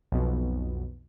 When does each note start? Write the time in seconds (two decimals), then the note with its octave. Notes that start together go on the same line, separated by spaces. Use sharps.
0.12 B1 F2 B2